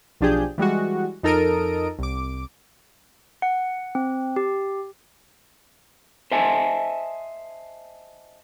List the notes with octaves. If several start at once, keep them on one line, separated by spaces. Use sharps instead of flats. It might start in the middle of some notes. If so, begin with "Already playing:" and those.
B1 F3 D4 G4 G#4 G6
E3 G3 G#3 F#4
F2 D#4 A4 A#4 D#6 D7
C2 D6
F#5
C4
G4
C5 D#5 E5 G#5 A5